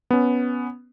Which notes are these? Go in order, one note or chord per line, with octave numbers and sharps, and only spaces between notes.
B3 C#4